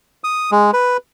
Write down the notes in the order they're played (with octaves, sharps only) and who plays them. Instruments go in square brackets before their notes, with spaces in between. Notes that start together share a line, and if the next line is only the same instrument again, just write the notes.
[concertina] D#6
G#3
B4